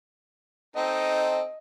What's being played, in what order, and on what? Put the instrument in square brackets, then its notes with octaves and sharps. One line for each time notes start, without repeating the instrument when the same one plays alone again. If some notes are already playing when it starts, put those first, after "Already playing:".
[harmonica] C4 D#4 A4 [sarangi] D#5